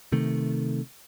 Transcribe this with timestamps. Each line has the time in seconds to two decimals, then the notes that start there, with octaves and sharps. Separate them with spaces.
0.12 C3 D#3 A3